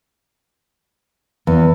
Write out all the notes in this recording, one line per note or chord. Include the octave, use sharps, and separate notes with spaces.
E2